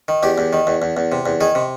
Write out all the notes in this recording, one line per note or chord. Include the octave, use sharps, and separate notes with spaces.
D#3
E2 G4
E2
D#3
E2
E2
E2
C3
E2
D#3 G#4
C3